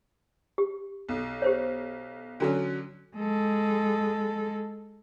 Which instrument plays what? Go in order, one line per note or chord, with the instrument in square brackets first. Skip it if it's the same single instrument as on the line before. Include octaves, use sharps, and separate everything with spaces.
[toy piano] G4
[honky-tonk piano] B1
[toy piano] G4 C5 C#5
[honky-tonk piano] D3 F#3 C#4
[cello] G#3 A4